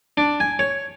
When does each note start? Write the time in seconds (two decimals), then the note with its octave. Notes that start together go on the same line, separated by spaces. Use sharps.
0.17 D4
0.40 G#5
0.59 C#5